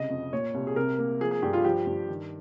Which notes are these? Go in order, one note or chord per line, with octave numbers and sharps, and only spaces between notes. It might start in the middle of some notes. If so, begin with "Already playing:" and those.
Already playing: C2 C#3 D#5
F2
A#2 C#5
C2
G#4
C3 A#4
A#3
F3 G#4
G#4
G2 G4
F4
F3 G4
G2
D#3